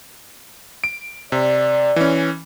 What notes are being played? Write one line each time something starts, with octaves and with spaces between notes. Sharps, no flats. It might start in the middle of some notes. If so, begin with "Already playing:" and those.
D7
C3 D5
E3 C#4